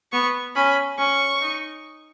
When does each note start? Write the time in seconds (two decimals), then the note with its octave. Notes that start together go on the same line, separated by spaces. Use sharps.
0.12 B3 C#6
0.55 C#4 B5
0.98 C#4 C#6
1.41 D#4